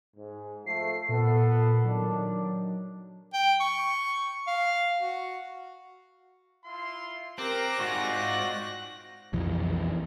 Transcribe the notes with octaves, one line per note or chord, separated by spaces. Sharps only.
G#2
F3 A3 C7
A#2 B3 A4
D#3 F#3 D4
G5
C#6
F5
F#4
E4 F4 C6
C4 G4 A#4 F#6 A#6
G#2 C4 F4 F#4 D5
B1 F2 E3